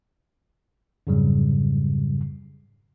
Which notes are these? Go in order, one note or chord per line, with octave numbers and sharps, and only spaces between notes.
F2 G#2 C#3 F#3 G3